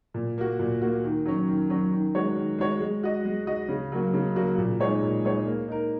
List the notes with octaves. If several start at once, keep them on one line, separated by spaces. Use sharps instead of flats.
A#2
A#3 F#4
A#2
A#3 F#4
D#3
F#3 C#4
D#3
F#3 C#4
D#3
G#3 F#4 C#5
D#3
G#3 F#4 C#5
G#3
F#4 D#5
G#3
F#4 D#5
C#3
F#3 A#3 F#4
C#3
F#3 A#3 F#4
A#2
G#3 D#4 G#4 C#5
A#2
G#3 D#4 G#4 C#5
A#3
D#4 A#4